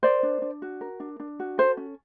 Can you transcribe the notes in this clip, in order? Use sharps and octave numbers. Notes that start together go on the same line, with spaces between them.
A#4 C5 D5
D4
D4
F#4
A#4
D4
D4
F#4
A4 C5
C#4